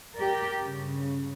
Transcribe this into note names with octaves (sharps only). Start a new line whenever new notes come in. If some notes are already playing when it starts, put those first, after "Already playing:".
G4 A#4 D5
G2 C#3